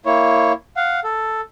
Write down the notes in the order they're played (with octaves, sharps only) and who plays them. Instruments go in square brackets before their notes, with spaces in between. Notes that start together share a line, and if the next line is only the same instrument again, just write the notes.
[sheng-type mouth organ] A#3 E4 C#5
F5 F#5
A4